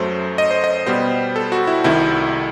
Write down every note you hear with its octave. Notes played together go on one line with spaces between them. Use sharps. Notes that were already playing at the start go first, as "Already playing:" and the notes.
Already playing: F#2 F#3 A3 C5
D#5
C5
D#5
B2 G3 B3 C5
A4
F#4
E4
C2 C3 D#3 A3 E4